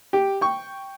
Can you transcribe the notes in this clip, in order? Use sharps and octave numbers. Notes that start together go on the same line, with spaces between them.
G4
G5 C#6